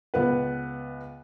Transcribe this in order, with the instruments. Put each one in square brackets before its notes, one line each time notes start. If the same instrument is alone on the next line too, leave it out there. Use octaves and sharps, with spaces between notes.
[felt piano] C#2 B3 B4